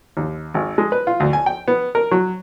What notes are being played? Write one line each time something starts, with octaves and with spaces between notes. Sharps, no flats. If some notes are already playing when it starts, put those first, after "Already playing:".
D#2
G#1
G#3
B4
F4
D2
G#5
G5
B3
A#4
F#3